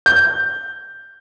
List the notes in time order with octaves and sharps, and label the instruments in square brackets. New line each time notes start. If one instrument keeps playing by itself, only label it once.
[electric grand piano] G6